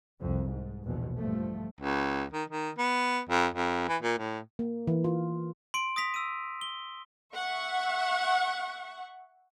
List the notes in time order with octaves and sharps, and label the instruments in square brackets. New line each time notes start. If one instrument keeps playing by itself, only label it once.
[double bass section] C2 F2
G#2
A#1 E2 B2
G2 F3 A3
[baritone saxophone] C#2
D#3
D#3
B3
F2
F2
E3
A#2
A2
[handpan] A#3
E3
F4
[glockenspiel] C6 D7
D#6 A#6 B6 F7
E6 D#7
G7
[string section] E5 F#5 C#6